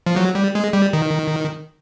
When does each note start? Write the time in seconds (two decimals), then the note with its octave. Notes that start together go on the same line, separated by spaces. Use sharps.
0.06 F3
0.16 F#3
0.35 G3
0.55 G#3
0.73 G3
0.93 D#3